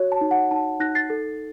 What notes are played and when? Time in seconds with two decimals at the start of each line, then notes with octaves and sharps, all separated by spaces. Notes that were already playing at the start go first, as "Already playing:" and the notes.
Already playing: F#4 C#5
0.12 A5
0.21 D#4
0.31 F#5
0.51 D#4 A5
0.80 D#4 F#6 A#6
0.95 A6 C7
1.10 A4